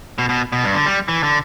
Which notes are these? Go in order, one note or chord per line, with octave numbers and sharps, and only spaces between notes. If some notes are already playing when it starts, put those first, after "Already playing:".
B2
B2
B2
G2
D3
G3
E3
D3